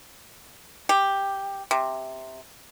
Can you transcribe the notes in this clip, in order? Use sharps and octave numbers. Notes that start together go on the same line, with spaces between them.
G4
C3